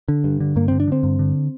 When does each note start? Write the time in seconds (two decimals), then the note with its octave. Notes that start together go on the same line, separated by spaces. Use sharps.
0.08 D3
0.24 G2
0.40 D3
0.56 G2 A#3
0.68 D3 C4
0.80 D4
0.87 D3 C4
1.03 G2
1.19 D3